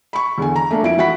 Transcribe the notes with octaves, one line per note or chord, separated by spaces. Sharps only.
B5 C#6
E2 D3 G#5
A#5
A3 A#3 D4
F2 E4 D7
E3 F#4 F#5 B5 B6